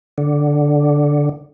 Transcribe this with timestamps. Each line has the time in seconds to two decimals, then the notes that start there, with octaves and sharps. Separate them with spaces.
0.18 D3